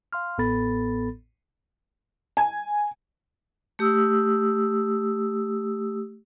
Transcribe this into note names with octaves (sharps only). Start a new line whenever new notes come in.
F5 C6 F6
A1 A2 B3 A4 B5 A6
G#5
A3 G4 D#6 E6